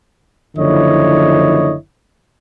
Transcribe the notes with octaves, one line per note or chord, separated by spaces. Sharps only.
F#1 D3 F3 E4 C#5 D#5